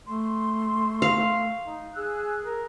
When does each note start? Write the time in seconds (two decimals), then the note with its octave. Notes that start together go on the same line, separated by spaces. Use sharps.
0.07 A3 C6
1.02 F5
1.66 D#4
1.95 G#4 E6 F#6
2.44 A#4